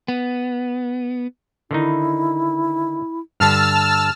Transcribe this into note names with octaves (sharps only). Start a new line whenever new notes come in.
B3
D3 D#3 D#4 E4
G2 D3 A5 E6 F6